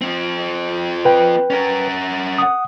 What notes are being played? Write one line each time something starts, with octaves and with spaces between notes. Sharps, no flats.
F3 C4
B4 G5
C#4 A#4
F#5 D#6